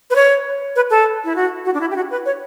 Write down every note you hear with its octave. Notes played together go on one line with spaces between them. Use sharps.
B4
C#5
B4
A4
E4
F#4
F#4
D4
E4
G4
F#4
B4
C#5